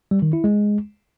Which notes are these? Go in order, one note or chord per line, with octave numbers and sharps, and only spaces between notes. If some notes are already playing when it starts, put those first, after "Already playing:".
G3
D#3
E4
G#3